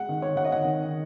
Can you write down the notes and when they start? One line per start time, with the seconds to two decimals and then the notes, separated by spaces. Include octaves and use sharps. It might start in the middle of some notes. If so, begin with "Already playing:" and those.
Already playing: G#3 F#5
0.09 D#3
0.22 C#5
0.36 D#3 F#5
0.45 D#5
0.52 F#5
0.65 D#3